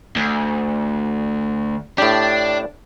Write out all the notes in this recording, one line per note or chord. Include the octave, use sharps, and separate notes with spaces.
D2
A2 D4 G4